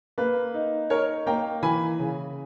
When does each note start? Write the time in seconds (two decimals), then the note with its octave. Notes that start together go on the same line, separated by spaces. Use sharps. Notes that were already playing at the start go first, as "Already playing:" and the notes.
0.18 A#3 B4
0.54 D#4
0.90 D#4 A#4 C#5
1.26 A#3 G5 A#5
1.62 E3 G#5 B5
1.99 C#3